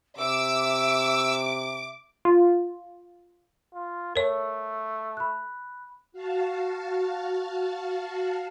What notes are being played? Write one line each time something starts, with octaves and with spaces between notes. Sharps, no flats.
C3 E5 D6 E6
F4
F4
A3 A#4 C#5
B5 F#6
F#4 F5 A5